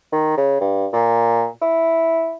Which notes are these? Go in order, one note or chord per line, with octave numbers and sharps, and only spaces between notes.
D#3
C#3
G2
A#2
E4